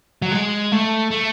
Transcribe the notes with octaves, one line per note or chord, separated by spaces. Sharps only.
F#3
G#3
A3
A3